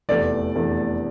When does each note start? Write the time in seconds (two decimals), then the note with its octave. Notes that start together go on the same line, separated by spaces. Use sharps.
0.09 F1 E2 E3 A3 D5
0.55 F1 E2 E3 A3